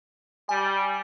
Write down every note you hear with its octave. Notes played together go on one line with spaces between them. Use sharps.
G3 G#5